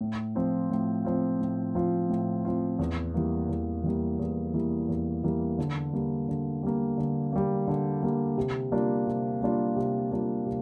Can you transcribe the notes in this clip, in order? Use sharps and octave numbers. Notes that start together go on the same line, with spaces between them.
A2
F3 C4 F4
A2
F3 C4 F4
A2
F3 C4 F4
A2
F3 C4 F4
E2
E3 G3 A#3
E2
E3 G3 A#3
E2
E3 G3 A#3
E2
E3 G3 A#3
D3
G3 A#3
D3
G3 A#3
D3
G3 A#3
D3
G3 A#3
C3
G3 A#3 D4 F4
C3
G3 A#3 D4 F4
C3
G3 A#3 D4 F4
C3